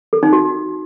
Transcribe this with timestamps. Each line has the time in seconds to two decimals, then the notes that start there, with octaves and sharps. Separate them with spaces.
0.13 A4
0.23 D#4
0.33 F#4